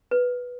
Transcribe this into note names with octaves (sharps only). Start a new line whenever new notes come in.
B4